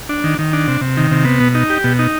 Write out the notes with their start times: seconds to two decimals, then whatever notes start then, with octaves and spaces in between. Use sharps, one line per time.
0.09 D4
0.24 D#3
0.39 D#3
0.53 D4
0.68 C3
0.81 C3
0.97 D#3
1.11 C3
1.25 B3
1.40 B2
1.55 D#4
1.70 G4
1.84 B2
1.99 D#4